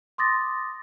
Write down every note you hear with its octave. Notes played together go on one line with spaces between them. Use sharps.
C6 D6 D#6 A6 A#6